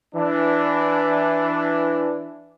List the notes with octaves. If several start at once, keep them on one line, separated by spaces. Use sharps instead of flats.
E3 D4